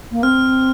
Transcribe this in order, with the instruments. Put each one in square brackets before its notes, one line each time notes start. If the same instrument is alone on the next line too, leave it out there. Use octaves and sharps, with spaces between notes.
[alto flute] A#3
[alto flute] C4 [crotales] F6